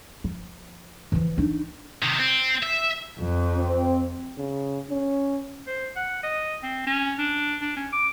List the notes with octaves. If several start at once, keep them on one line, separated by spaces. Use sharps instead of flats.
F3
E3 F3
D4 D#4
C3 D#3
C4
E5
F2
C4
C#3
C#4
C5
F#5
D#5
C4
C#4
D4
D4
C#4
D6